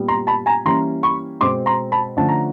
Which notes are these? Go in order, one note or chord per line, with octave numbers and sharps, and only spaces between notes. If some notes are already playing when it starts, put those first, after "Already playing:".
Already playing: A#2 G3 B3
A#5 C6
A5 B5
G#5 A#5
E3 G3 A#3 C#4 A#5 C6
B5 C#6
B2 G#3 C4 C6 D6
A#5 C6
A5 B5
D3 F3 A3 C#4 A5
A#5